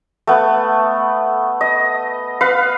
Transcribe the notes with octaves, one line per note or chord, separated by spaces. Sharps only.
A3 B3
D#5
B4 F5